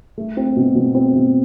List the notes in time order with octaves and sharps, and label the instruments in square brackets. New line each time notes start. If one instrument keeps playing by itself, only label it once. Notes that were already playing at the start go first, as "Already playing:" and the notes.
[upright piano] A3
C4
B2
B2
C4
B2